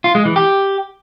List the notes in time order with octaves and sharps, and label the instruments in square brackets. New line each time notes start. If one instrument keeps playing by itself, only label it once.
[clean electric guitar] F4
G#3
E3
G4